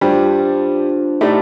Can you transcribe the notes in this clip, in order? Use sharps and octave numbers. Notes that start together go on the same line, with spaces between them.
G2 G3 D4 F4 C5
A2 A3 D#4 G4 D5 A5